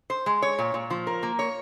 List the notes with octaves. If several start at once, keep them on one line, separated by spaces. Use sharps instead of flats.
C5
G#3
C#5
A#2
A#2
F3
A#4
A#3
C#5